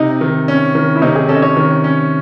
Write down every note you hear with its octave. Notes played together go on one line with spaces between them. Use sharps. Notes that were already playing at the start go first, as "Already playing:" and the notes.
Already playing: C3 D#4
D#3
C#4
D#3
E4
C3 D#4
G#4
C#4 A4
D#5
C#5
D#3
C#4